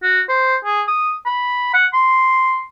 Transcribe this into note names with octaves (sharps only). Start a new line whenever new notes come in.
F#4
C5
G#4
D#6
B5
F#5
C6